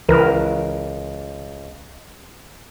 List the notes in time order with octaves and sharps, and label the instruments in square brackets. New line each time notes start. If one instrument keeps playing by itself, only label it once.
[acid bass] C#2 [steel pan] E3 A#4 B4